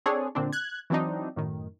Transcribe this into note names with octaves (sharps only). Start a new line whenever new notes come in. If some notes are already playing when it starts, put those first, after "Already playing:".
C4 D4 G#4 A4 C#5
A#2 D3 C4 D4
F#6 G#6
E3 F#3 C4 D4 D#4
F#2 A2 D#3